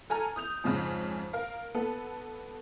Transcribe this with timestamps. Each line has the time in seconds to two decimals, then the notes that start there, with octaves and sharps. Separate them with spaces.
0.10 A4 G#5 A#5 F6
0.36 D#6 G6 F7
0.64 F2 G#2 C#3
1.33 A#4 F5
1.75 B3 A4